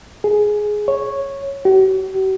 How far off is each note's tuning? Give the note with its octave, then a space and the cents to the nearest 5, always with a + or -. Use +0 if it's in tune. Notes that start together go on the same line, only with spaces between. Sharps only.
G#4 +10
C#5 -5
F#4 +45